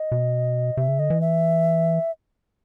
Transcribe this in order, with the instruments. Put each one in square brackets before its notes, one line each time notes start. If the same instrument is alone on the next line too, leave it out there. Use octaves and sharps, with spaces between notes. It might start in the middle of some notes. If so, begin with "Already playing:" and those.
Already playing: [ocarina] D#5
[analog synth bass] B2
[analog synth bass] C3 [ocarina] E5
[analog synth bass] C#3
[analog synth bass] D3 [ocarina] D#5
[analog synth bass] E3
[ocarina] E5